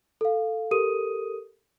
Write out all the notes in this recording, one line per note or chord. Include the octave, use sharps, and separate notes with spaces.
A4 F5
G4 A4 A#4 D#6 D#7